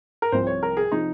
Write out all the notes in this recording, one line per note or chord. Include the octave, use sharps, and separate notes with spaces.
A#4
C2 C3 F3 C5
C#5
A#4
G#4
C3 F3 D#4